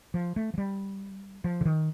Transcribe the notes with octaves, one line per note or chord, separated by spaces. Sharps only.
F3
A3
F3
G3
F3
D3
D#3